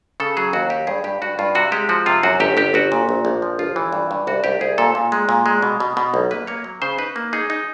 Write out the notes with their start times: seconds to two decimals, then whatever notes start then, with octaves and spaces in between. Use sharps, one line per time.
0.20 C#3 A4
0.37 F#3 G#4
0.53 D#2 F#4
0.70 F#3 G4
0.87 G2 G#4
1.04 G2 G4
1.22 G2 F#4
1.39 G2 F4
1.55 C3 F#4
1.72 G#3 G4
1.89 F3 F#4
2.06 C3 F4
2.23 F#2 F#4
2.40 G1 G4
2.57 G1 G4
2.74 G1 F#4
2.92 A#2
3.09 A#1
3.25 A#1
3.42 F3
3.59 G1 F4
3.76 E3
3.93 G2
4.11 G2
4.27 C2 F#4
4.44 C2 G4
4.61 C2 G#4
4.78 A#2 A4
4.95 A#2
5.12 G#3
5.29 A#2
5.46 G#3
5.62 B2
5.80 B2
5.97 B2
6.14 B1
6.31 A#3 B4
6.47 A#3 C#5
6.64 F#3
6.82 C#3 C5
6.98 D#4 B4
7.16 A#3
7.33 D#4 G#4
7.50 D#4